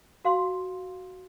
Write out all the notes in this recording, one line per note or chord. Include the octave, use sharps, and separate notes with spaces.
F#4 F5 C6